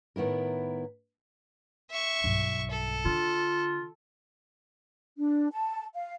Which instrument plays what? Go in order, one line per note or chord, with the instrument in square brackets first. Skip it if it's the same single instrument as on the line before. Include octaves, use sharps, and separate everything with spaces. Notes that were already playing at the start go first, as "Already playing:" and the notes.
[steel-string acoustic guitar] A2 D#3 B3 E4 A#4
[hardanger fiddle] E5 C#6
[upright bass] B1 G2
[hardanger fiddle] A4
[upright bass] D3 [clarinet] F4
[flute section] D4
A5
F5